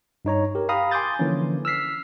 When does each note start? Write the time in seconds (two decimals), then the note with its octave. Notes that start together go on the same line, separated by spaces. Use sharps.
0.25 G2 D#4 C#5 A#5
0.55 G4 A#4
0.69 F5 G5 A#5 B5 D#6
0.91 G#5 C6 D6 D#6 G6 A6
1.19 D3 E3 F3 A#3 C#4
1.65 E6 F6 B6 C7